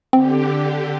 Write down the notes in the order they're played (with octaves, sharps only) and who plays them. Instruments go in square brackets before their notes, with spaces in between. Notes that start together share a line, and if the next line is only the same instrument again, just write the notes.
[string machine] D3 G4 [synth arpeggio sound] C4